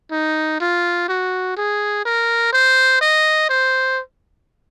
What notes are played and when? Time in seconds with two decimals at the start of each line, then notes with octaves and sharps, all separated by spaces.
0.11 D#4
0.60 F4
1.09 F#4
1.57 G#4
2.05 A#4
2.53 C5
3.01 D#5
3.49 C5